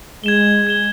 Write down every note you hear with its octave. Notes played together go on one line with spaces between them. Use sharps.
G#3 G#6 E7 G7
G#6 E7 G7